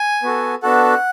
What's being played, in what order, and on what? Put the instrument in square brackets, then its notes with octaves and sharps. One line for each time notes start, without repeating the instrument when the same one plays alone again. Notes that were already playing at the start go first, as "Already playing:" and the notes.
Already playing: [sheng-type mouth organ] G#5
B3 F#4 A4
B3 D4 F#4 A4 F#5